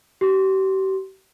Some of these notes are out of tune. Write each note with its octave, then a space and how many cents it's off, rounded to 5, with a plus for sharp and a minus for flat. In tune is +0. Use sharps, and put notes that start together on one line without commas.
G4 -40 C6 +10